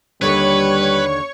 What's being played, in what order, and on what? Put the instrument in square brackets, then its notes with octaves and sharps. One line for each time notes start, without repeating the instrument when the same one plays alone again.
[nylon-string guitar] D#2 D3 D4 [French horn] G3 [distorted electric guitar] B4 [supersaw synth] C#5 C#6